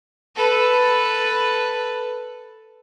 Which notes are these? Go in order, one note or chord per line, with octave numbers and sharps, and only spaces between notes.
A4 B4